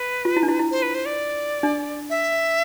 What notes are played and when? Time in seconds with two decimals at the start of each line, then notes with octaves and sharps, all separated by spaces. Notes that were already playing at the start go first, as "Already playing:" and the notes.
Already playing: B4
0.25 F4
0.37 E4
0.43 D4
0.48 E4
0.60 E4
0.71 C5
0.82 B4
0.94 C5
1.06 D5
1.63 D4
2.10 E5